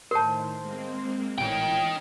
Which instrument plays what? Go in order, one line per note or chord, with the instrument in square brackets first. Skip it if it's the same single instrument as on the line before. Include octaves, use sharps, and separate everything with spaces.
[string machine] A2 D#3 [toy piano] A#4 A5 [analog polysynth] C5
[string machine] G#3 A#3 C4
[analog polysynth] A1 A#2 E3 [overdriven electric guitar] D#4 G5 [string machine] C#5 G#6 B6